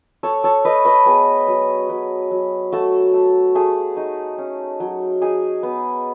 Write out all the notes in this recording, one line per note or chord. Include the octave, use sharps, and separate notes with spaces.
A3 A4 C#5
A4 C#5
A3 B4 D#5
B4 D#5
B3 G#4
F#3
F#3
F#3
A3 F#4 A4
A3
A3 G#4
D#4
C#4
F#3
D#4 G#4
B3